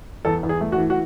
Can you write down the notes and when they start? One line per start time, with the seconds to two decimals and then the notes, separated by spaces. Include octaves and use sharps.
0.25 E2 A4
0.43 E2
0.49 G#4
0.61 A3
0.72 F#4
0.78 E3
0.90 F#4